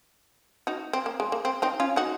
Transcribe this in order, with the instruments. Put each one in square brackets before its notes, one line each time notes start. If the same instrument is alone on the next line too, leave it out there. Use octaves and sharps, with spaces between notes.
[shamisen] D#4 F#4
C4
A#3
G#3
A#3
C4
C4 D#4
C#4 F4
D#4 F#4